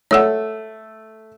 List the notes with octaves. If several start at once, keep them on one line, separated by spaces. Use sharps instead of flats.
A3 C#5 F#5 E6